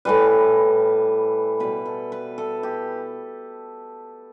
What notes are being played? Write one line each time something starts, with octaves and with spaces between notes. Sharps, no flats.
A2 E3 G3 B4
B2 G3 B4
A4
B4
A4
G4